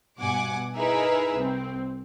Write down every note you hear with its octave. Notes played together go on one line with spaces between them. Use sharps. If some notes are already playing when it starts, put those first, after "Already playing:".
G2 B2 F#5 G#5 D6
D#4 E4 G#4 A#4 B4 E5
C2 C4